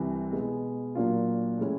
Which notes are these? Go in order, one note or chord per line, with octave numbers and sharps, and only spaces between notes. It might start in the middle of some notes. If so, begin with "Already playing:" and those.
Already playing: C2 C3 E3
B2 G#3 B3
A#2 F#3 A#3 D4 F4
A2 E3 G#3 C#4 E4